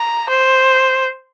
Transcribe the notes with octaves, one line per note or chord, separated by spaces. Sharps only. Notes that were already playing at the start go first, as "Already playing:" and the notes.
Already playing: A#5
C5